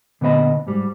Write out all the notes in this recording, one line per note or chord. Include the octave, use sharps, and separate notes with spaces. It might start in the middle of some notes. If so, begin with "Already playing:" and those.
A#2 D3 B3 C#5 D#5 B5
G#2 G3